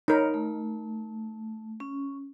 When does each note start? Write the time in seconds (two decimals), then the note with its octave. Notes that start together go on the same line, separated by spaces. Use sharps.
0.08 D#4 A#4 C#5 B5
0.34 A3
1.80 C#4